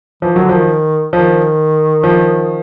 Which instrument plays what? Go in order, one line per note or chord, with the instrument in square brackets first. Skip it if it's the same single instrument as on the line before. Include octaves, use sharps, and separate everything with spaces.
[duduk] E3 [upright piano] F3
[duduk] D#3 [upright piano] F#3
[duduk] D3
[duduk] D#3 [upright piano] F3
[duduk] D#3 [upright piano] F3
[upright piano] F3